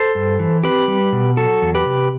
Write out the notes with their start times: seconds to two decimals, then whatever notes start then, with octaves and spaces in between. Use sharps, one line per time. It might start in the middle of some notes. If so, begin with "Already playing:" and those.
Already playing: A4 C5
0.15 G2
0.39 E3
0.63 C4 G4 B4
0.88 G3
1.13 B2
1.37 F#3 F#4 A4
1.62 E2
1.75 G4 B4
1.86 C3